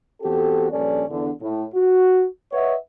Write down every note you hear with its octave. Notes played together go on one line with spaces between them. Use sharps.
E2 C4 F#4 G4 A4
A#1 G2 C#4 A4 D5
E2 D3
A2
F#4
B4 C#5 D#5 E5 F#5